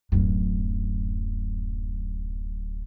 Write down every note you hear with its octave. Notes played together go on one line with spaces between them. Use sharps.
D1 F#2